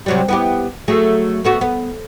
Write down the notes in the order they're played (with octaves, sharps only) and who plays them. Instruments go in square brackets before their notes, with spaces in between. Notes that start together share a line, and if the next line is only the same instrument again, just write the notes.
[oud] C3 F#3 G3
B3 E4 G4
F#3 A3 G#4
A3 B3 F#4
B3